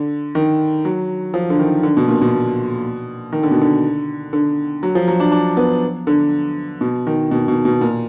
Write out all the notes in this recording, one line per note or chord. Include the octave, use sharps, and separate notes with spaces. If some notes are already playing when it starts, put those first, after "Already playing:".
Already playing: D3
D#3
F#3
F3
D3
D#3
D3
B2
A#2
B2
D#3
D3
B2
D3
D3
F#3
F3
F#3
D4
D4
B3
D3
B2
D#3
B2
B2
B2
A#2